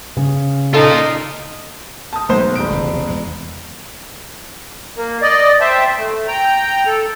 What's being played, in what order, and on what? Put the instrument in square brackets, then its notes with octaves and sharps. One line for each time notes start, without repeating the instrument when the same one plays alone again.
[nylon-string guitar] C#3
[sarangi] D#4 [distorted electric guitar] F4 A#4 [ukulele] A4 A5
[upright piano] A5 D#6
[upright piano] B1 C5 [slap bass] B2 G#3 A3
[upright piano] E1 D7
[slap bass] F1 C#2 C3
E2 G#3
[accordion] A#3
D5 D#5
C5 E5 G5 A5
A3
G5 A#5
A4